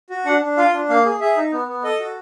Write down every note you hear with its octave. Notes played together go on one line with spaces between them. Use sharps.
F#4
D4 F#5
D4
F4 F5
D4
A#3 F5
G#4
G#4 E5
D#4
B3
B3
A4 D#5
F#4